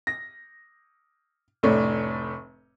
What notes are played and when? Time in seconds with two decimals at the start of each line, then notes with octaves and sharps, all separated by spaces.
0.07 A#6
1.63 F1 A2 A3 D4 C#5